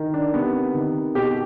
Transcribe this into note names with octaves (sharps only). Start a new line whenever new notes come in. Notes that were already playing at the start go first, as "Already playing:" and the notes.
Already playing: D#3
D4
C3 B3
D#3
B2 G4